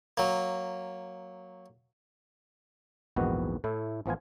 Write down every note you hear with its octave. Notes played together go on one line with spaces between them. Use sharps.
F#3 A#3
A#1 E2 G#2 D#3 B3 F#4
A2 A3 E4
A1 F3 B3 F4 G#5